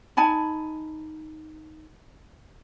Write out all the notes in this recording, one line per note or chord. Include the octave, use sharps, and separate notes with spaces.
D#4 G#5 A5 B5